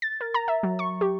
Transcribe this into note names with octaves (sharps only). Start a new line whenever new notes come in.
A6
A#4
A#5
E5
F#3
C#6
G4